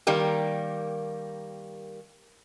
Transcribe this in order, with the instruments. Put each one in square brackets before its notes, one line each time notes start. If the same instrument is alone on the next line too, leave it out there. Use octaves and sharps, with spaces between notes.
[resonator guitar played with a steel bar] D#3 G3 A#3 G4